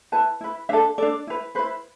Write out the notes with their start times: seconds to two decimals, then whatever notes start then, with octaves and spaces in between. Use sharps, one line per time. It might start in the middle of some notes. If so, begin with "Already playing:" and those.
0.12 E4 B4 A5
0.41 E4 B4
0.69 D4 A4 E5
0.98 D4 A4 D5
1.27 E4 B4
1.55 E4 B4 C5